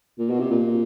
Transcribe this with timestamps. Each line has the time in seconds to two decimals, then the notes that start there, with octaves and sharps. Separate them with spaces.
0.19 A#2
0.30 B2
0.40 C3
0.50 A#2